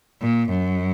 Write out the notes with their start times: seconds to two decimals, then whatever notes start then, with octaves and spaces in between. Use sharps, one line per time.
0.22 A#2
0.49 F#2